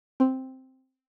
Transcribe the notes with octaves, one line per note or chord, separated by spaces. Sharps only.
C4